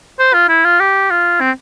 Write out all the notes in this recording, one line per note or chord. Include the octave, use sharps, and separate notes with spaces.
C5
F4
E4
F4
G4
F4
C4